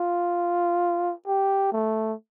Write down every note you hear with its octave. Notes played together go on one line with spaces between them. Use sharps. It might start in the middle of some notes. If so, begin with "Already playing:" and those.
Already playing: F4
G4
A3